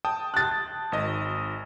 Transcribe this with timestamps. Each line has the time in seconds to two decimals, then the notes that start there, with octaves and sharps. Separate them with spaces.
0.05 G5 A5 D#6
0.34 F#6 A6
0.92 G#1 D#5